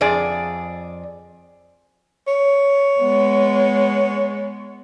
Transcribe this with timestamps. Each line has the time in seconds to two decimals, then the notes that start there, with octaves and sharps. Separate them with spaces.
0.01 F2 G#4 D5
2.27 C#5
3.01 G#3 B3